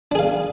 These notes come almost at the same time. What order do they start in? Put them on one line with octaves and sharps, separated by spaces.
D4 G#4 F5